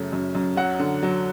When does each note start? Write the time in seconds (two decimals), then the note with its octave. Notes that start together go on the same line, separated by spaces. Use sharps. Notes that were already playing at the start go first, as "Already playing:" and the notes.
Already playing: F#2 C#3 A3
0.13 F#2
0.35 F#2
0.57 F#3 F#5
0.79 D3
1.03 F#3